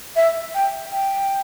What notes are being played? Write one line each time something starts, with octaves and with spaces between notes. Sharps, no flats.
E5
G5
G5